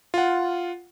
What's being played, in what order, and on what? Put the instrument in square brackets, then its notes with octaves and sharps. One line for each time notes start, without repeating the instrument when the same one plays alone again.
[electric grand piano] F4 F#5